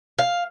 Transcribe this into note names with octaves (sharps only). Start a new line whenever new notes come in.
F5